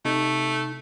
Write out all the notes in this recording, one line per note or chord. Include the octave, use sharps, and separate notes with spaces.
C3 A3 D#4